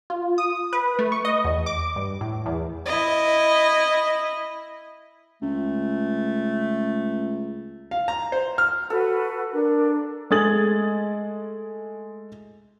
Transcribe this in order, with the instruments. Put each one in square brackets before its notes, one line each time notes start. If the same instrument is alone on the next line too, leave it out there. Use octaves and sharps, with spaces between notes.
[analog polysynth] F4
D#6
B4
A3
C#6
D#5
E2
D6
G2
A2
E2
[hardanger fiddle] E4 D#5
[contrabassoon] C#2 [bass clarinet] A3
[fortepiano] F5
A#5
C5
F6
[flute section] F#4 B4 [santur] A4
[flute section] D4 [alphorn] A#4
[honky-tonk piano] G#3 A3 D#6 G#6 A6 F#7